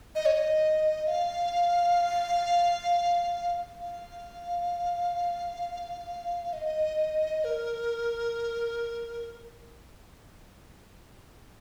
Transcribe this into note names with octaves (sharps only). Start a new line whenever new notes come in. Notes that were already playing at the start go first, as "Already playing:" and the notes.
D#5
C#5
D#5
F5
F5
D#5
A#4